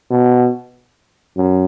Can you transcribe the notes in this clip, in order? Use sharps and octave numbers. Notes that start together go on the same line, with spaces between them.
B2
F#2